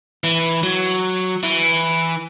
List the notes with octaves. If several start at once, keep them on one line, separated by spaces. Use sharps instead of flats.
E3
F#3
E3